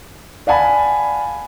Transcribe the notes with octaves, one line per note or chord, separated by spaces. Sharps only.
D5 F5 F#5 G#5 A5 B5